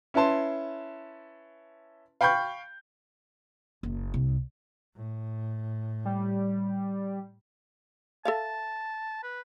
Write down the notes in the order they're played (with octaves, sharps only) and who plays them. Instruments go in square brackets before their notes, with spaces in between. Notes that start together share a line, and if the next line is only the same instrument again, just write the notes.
[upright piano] C#4 E4 B4 A5 C6
F5 G5 B5 C#6 G6
[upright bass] F#1
C2
[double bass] A2
[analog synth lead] G3
[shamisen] A4 E5 F5 [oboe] A5
[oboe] B4